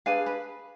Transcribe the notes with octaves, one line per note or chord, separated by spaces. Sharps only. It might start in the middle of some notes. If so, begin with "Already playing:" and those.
D4 G#4 B4 F5 G#5
B4